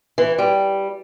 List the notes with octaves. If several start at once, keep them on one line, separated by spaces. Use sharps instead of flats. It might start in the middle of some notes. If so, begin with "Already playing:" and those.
E3
G3